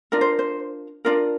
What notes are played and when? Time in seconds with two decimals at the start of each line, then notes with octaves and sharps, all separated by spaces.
0.12 D4 F4 A#4 D5
0.21 C5
0.39 C5
1.05 D4 F4 A#4 D5